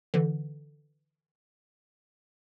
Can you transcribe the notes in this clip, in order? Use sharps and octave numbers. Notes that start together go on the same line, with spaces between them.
D3 E3